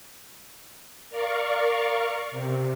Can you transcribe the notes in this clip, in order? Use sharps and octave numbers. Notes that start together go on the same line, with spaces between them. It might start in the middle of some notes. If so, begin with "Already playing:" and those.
A#4 D5 F5 C#6
C3